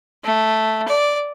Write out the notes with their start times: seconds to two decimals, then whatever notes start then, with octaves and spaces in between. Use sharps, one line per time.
0.24 A3
0.88 D5